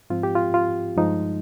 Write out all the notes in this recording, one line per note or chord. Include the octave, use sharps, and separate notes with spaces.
G#2 F3 C4 F4
G4
F4
F4
G2 F3 G#3 D#4